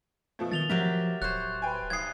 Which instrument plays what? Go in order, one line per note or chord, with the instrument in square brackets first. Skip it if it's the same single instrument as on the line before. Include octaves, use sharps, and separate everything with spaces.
[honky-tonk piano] B2 F3 A3
[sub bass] D#3 [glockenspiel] A6 F7 G7
[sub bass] F3 [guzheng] F#3 G4 E5 [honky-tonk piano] A#4
[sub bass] D1 [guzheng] C5 C#5 [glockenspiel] F#6
[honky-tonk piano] B4 G5 G#5
[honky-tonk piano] B1 D#6 [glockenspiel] G#6 C7